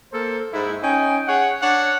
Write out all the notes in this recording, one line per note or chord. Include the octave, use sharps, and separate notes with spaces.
A#3 A4 A#4 C5
G#2 E4
C#4 D#4 G5 G#5
G#4 C#5 F#5
D4 C#5 F#5